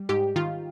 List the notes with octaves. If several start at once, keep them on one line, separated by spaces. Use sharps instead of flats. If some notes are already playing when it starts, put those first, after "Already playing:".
Already playing: G3
G#2 G4
D#3 F4